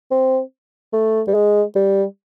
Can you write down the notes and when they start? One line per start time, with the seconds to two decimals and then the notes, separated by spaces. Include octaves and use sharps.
0.11 C4
0.93 A3
1.27 G3
1.34 G#3
1.75 G3